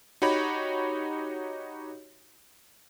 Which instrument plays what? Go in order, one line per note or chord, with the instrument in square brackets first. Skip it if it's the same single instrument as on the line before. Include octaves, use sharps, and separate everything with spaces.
[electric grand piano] D#4 F#4 G4 C#5 B5